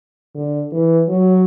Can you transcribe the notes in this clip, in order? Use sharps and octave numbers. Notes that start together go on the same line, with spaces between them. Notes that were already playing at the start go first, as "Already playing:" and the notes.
D3
E3
F#3